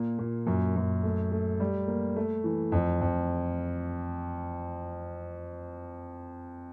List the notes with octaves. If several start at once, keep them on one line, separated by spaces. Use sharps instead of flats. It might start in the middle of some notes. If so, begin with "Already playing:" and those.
Already playing: A#2 A#3
A#2
F#2
F#2
A3
A3
G3
A#3
A3
E3
F2
F2